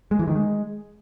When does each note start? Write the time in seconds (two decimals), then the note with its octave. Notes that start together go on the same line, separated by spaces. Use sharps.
0.11 G#3
0.19 E3
0.28 D#3
0.36 G#3